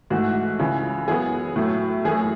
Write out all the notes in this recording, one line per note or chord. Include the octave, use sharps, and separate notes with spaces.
G#2 E3 A3 F#4
C#2 C#3 E3
F#2 E3 B3 G#4
A2 F#3 A3
F#2 E3 A3 G#4